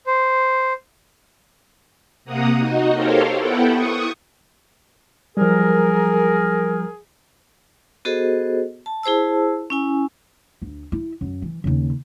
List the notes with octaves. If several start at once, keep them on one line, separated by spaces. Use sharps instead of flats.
C5
C3 A#3 A#4 F#5 D#6
D#4 F#4 D#5
G4 A4 A#4 C5 C#5 F5
B3 E4 A4 F#5 G5
C#6 D#6
F3 G3 G#4 A#4
B3 F#4 G#4 A4 C5 D#5
A5
E4 G#4 C5 A5 E6
C#4 E4 G#5
D2
E4
F#2
E3
D#2 C#3